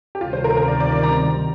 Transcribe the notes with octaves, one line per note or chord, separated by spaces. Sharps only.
G4
D2 C3 D#3 G3 C4 F4
C5
A#4
A#4
D5
D5
D5
A#5